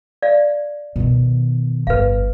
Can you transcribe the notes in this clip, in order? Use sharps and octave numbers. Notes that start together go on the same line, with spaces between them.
D5 F5
B2 D#3
G1 F2 B4 F5